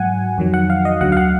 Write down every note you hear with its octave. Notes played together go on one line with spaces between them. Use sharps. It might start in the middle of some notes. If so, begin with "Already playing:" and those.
Already playing: G#2 F#3 F#5 G#5
F2 D#3 F#3
F#5
F5
D#5
D2 D3 F#3 F#5
F5
F#5